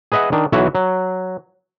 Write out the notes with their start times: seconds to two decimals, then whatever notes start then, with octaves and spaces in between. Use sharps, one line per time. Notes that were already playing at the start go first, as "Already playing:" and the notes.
0.12 G#4 B4 D#5 E5 F#5
0.32 D#3 D4
0.52 B1 E3 F#4 C#5 E5
0.75 F#3